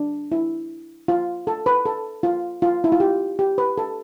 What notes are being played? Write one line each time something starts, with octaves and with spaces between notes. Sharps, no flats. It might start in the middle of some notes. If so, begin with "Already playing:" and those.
Already playing: D4
E4
F4
A4
B4
A4
F4
F4
E4
F4
G4
G4
B4
A4